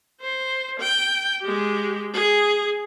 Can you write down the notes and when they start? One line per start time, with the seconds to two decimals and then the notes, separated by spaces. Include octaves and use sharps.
0.21 C5
0.80 G5
1.42 G#3 G4
2.14 G#4